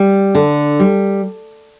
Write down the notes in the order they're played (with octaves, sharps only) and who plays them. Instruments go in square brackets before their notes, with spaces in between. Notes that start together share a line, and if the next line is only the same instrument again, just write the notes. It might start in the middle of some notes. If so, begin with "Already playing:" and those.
Already playing: [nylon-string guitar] G3
D3
G3